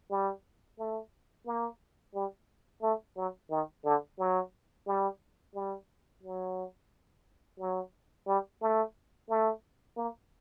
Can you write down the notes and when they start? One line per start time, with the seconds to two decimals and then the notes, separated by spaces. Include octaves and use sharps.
0.10 G3
0.78 A3
1.46 A#3
2.15 G3
2.82 A3
3.17 F#3
3.51 D#3
3.85 D3
4.19 F#3
4.87 G3
5.55 G3
6.23 F#3
7.59 F#3
8.27 G3
8.61 A3
9.29 A3
9.97 A#3